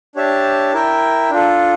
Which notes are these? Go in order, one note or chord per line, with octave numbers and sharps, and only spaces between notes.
D4 G4 C#5 E5 A5
E4 A#4 E5 G5
D4 F4 A4